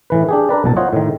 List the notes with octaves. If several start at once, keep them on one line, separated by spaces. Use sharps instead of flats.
A2 E3 B4
D4 G4 G#4
D4 A#4 B4 D5
B1 A#2 A5
F4 C5 C#5 D#5 F#5
A2 D#3